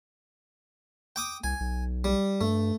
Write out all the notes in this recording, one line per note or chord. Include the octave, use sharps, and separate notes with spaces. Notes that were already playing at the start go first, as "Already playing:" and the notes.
G5 D6 D#6
C2 G#5
B1
G3
G2 A3